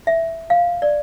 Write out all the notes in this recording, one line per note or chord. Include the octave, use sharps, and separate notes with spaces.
E5
F5
D5